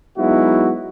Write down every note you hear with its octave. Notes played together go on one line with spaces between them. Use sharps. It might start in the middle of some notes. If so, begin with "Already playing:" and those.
F#3 G#3 B3 D#4 E4 F#4